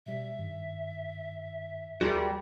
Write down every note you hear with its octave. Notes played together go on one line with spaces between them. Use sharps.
B2 G3 E5
G2 D#3
D#2 G3 F#4 G#4 A#4 C6 A#6